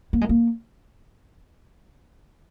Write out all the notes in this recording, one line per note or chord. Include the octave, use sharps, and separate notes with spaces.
A#3
G#3
A#3